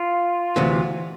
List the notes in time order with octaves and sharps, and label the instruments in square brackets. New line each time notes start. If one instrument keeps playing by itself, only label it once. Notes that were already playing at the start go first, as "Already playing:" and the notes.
Already playing: [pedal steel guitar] F4
[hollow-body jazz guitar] D2 C3 E3